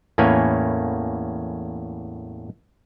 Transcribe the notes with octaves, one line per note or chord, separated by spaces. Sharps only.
E2 A2 A#3 C#4 B4 G#5